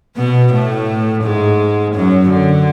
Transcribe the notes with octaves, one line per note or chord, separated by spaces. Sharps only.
B2 B3
A2 A3
G#2 G#3
F#2 F#3
D3